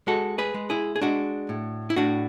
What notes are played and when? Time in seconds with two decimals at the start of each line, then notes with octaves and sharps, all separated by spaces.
0.07 G#3 F#4 A4
0.38 G#4 B4
0.54 G#3
0.70 E4 G#4
0.96 G#4
1.01 G#3 D4 F#4
1.49 A2
1.90 E4
1.96 A2 D4 F#4